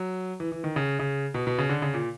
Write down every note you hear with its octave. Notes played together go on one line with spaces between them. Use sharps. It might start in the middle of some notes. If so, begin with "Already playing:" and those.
Already playing: F#3
E3
E3
D#3
C#3
C#3
B2
B2
C#3
D3
C#3
A#2